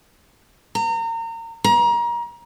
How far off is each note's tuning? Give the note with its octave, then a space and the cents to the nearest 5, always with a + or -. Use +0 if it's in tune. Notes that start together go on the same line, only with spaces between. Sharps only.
A#5 -30
A#5 +30